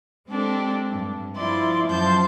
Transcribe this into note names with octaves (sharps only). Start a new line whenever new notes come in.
G#3 C4 D4 G4 A4
G2
F3 E4 D5 C6
F#2 F3 F#3 A5 C6 G6